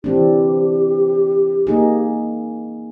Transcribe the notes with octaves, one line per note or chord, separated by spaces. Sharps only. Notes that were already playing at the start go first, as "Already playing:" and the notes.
E3 C4 D4 G4
A#3 D#4 G#4